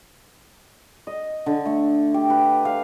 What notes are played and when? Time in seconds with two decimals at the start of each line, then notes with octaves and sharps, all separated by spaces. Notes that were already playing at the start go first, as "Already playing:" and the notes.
1.07 D#5
1.46 D3
1.65 A3
2.14 G4
2.30 B4
2.65 F5